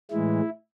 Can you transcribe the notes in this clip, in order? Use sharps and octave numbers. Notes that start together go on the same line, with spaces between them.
A2 E3 G#3 E4